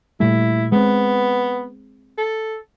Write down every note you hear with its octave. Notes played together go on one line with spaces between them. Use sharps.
A#2 G3 A3 E4
G#3 B3 C4
A4